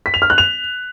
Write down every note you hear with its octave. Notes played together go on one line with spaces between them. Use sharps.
B6
F7
F6
F#6
F7